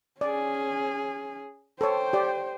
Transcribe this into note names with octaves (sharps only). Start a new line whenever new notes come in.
C#4 G#4 D5
A4 C5 C#5 G5
G4 D5